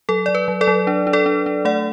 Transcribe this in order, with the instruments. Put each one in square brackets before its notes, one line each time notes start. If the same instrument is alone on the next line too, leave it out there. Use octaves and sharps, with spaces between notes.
[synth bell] F#3 A4
F#3 D5
B4
F#3
A4 D5
F#3
D4
D4
A4 D5
D4
D4
A3 D5 F#5